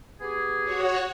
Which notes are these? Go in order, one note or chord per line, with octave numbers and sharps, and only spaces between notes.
B3 G4 G#4
F#4 C#5